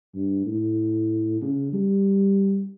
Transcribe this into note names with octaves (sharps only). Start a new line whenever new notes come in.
G2
A2
C#3
G3